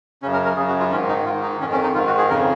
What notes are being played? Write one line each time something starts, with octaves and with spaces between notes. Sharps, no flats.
F#2 C#3 C#4
A#4
A#4
F#2 C#3 G#4
F#4
F4
G#2 D#3 C#4
D#4
G#2 D#3 F4
D#4
F2 D#3 C#4
C#4
D#4
G#2 D#3 F4
F#4
G#4
F2 C#3 A#4